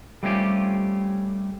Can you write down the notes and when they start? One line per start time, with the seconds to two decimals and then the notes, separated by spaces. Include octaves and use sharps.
0.23 G3 A3 C4 C#4 F4 G4